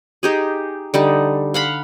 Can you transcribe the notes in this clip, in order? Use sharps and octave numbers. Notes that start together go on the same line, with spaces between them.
D#4 G4 G#4
D3 G3 D#4
F5 F#5 B5 C6